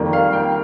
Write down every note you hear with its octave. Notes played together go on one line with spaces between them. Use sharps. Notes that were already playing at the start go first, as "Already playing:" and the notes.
Already playing: F2 D#3 G3 A#3
F5
G5